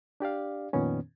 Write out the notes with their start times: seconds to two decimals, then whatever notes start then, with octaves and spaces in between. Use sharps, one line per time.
0.20 D4 G4 D5 F5
0.73 F2 A#2 D#3 B3 C#4